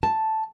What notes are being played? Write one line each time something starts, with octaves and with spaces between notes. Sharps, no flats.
A5